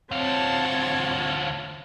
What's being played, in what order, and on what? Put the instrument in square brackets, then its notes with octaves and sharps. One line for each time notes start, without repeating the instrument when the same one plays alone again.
[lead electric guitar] D2 F4 [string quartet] C4 C#5 A5